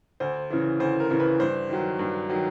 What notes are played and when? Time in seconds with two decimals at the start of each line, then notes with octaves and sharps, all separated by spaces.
0.20 D2 C5
0.50 C#3 E3
0.80 D2 C5
1.00 A#4
1.10 C#3 E3
1.20 B4
1.40 G2 C5
1.70 D#3 F#3
1.99 G2
2.30 D#3 F#3